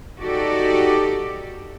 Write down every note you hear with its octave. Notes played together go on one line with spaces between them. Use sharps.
D#4 F#4 G4 A4 D5